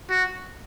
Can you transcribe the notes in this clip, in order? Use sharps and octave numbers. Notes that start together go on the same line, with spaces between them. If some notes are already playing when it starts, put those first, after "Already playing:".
F#4